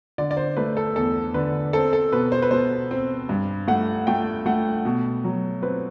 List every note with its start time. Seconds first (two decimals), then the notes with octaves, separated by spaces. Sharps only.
0.18 D3 D5
0.31 D5
0.37 C5
0.57 A3 B4
0.77 A4
0.95 E2 A4
1.34 D3 B4
1.73 C4 A4
1.93 A4
2.12 B2 B4
2.32 C5
2.42 B4
2.51 B2 C5
2.91 C4
3.29 G2
3.68 A3 F#5
4.07 A3 G5
4.46 A3 F#5
4.85 B2
5.24 F#3
5.63 C4 B4